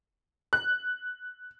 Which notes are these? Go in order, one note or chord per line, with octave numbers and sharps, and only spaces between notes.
F#6